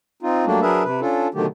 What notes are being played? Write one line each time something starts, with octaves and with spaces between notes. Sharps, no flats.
C4 D#4 F4
F#3 G3 A3 A#3 D4
F#3 D4 G#4 A#4 B4 E5
C3 B4
C#4 D4 F4 A4
B2 D3 D#3 F#3 A3 G4